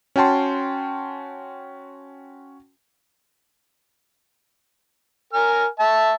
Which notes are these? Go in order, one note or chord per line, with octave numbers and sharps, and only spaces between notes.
C#4 F#4 G5 A5 C6
A#4 G#5 F6
E5 A5